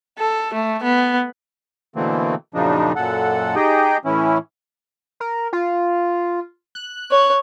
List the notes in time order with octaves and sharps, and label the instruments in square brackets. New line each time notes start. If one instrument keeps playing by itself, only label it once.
[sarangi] A4
A3
B3
[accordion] B2 D3 E3 A3 A#3 C4
F#2 A#2 C#3 F3 D4 D#4
F#2 A#2 A4 F#5
D#4 G4 G#4 D#5 G5
A2 E3 C#4 E4
[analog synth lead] A#4
F4
F#6
[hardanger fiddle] C#5